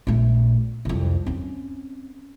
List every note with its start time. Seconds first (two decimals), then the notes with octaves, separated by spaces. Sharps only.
0.07 A#1 A3
0.85 C2 F2
1.26 C4 C#4